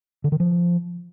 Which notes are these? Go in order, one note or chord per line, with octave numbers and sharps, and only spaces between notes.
D3
D#3
F3